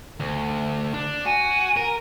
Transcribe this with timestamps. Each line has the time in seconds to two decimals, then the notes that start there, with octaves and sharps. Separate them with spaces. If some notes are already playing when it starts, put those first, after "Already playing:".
0.20 D2
0.94 D4
1.25 F#4 G#5
1.77 A#4